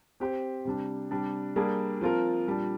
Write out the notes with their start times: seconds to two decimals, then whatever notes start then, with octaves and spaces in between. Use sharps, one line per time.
0.20 C4 G4 C5
0.65 C3 G3 D4
1.11 C3 G3 D4
1.56 G3 A#3 D4 G#4
2.01 F3 C4 F4 A#4
2.46 A#2 G3 D4